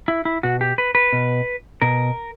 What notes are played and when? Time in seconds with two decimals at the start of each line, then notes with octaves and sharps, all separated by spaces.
0.08 E4
0.25 E4
0.43 B2 F#4
0.61 G4
0.78 B4
0.95 B4
1.13 B2
1.82 B2 A#4